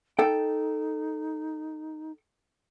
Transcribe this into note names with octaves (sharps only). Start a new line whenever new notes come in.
D#4 A4 G5